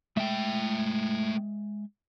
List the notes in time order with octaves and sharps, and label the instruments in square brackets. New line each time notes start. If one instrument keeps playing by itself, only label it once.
[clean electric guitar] G#3 E5 [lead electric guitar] A3 G5